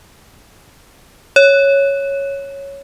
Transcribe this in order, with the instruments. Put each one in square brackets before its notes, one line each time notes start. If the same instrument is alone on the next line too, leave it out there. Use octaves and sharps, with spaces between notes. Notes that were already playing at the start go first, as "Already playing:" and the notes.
[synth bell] C#5